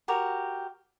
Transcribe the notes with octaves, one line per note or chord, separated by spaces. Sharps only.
F#4 G4 A#4